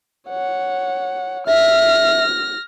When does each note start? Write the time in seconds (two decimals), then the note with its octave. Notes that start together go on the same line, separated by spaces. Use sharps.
0.29 C#5 F#5
1.47 E5 F6 A#6